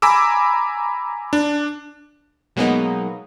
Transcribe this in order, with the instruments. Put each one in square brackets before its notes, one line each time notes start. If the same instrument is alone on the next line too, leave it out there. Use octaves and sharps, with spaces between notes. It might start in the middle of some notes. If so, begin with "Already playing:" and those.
[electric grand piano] G#5 A#5 B5 D6 E6
D4
[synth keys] B2 F#3 G#3 A#3 B3 D#4